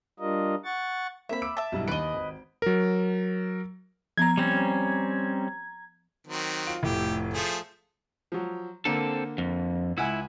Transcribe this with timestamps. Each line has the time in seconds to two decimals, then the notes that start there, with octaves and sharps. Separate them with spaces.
0.20 G3 D4 F4 A#4 D#5
0.64 F#5 C#6 A6
1.29 A#3 C4 E5 B5
1.42 D6 E6 D7
1.57 E5 A5
1.72 B1 G2 E4
1.88 D#2 B4 D#5 D7
2.14 G#1
2.62 F#3 A#4
4.17 F3 B3 A#5 G#6
4.37 G3 C4 C#4
6.27 D#3 F#3 C4
6.67 F4 D7
6.83 F1 A2 E4 G4
7.34 F3 A3 G#4
8.32 F3 F#3
8.85 D3 A#3 C4 A4
9.38 F2
9.98 C#2 E4 F#5 G#5